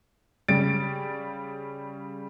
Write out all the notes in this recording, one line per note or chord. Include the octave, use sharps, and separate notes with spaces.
C#3 G3 A6 D7